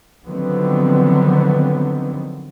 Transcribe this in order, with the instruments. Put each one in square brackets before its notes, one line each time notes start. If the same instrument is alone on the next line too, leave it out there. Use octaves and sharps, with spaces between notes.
[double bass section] D3 D#3 F3 F#3 B3 C4